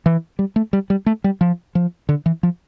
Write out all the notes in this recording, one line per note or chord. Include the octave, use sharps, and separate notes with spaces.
E3
G3
A3
G3
G3
A3
G3
F3
F3
D3
E3
F3